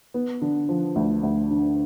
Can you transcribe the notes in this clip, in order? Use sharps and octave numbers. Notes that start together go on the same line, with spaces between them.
B3
D3
F3
D2
D2
D3